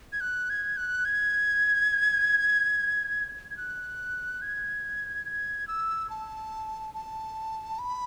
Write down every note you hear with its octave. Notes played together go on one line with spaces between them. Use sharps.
G#6
F#6
G#6
F#6
G#6
G#6
F#6
G#6
G#6
E6
A5
A5
B5